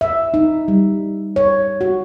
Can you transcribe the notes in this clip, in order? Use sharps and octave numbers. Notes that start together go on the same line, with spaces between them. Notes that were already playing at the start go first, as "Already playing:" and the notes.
E5
D#4
G3
C#5
F#4